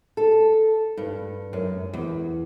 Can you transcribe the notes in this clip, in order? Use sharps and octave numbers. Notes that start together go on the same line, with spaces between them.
A4
G2
F#2
E2